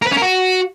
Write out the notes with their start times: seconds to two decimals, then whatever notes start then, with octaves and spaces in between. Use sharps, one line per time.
0.02 A#4
0.07 B4
0.12 C#4
0.17 A#4
0.22 F#4